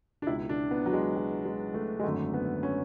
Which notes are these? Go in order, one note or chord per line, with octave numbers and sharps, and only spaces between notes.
D4
C#2 B2 E4
D4
B3
F#3
G#3
F#3
G#3
A3
G#3
G#1 F#2 D3 A3
B3
C#4